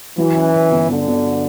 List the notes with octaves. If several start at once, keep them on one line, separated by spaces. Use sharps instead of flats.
E3 F#3
C#4
C#4
G1
G1 D3
G1